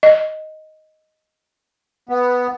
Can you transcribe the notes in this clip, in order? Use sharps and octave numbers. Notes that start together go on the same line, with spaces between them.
D#5
B3